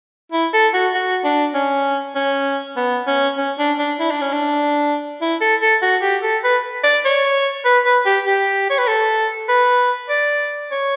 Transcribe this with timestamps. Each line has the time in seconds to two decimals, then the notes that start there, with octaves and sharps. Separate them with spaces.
0.32 E4
0.53 A4
0.74 F#4
0.94 F#4
1.24 D4
1.54 C#4
2.15 C#4
2.76 B3
3.07 C#4
3.37 C#4
3.58 D4
3.79 D4
4.00 E4
4.11 D4
4.21 C#4
4.33 D4
5.21 E4
5.41 A4
5.62 A4
5.82 F#4
6.02 G4
6.23 A4
6.44 B4
6.84 D5
7.05 C#5
7.65 B4
7.85 B4
8.06 G4
8.26 G4
8.70 C#5
8.78 B4
8.87 A4
9.49 B4
10.09 D5
10.71 C#5